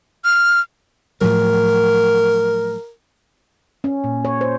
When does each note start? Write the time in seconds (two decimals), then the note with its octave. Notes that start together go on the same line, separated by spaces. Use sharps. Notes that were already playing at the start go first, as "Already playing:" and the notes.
0.24 F6
1.21 A2 F3 F#3 A#4
3.84 C#4
4.04 A#2
4.25 C#5
4.41 C5